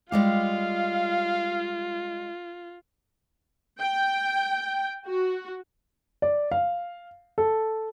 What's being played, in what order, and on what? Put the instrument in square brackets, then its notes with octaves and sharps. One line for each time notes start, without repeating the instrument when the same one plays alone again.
[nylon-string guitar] G3 G#3 G4 [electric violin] F4 [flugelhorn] F5
[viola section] G5
F#4
[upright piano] D5
F5
A4